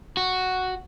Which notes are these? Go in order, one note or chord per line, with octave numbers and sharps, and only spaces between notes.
F#4